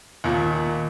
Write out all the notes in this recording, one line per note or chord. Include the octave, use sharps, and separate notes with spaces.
D#2 A#2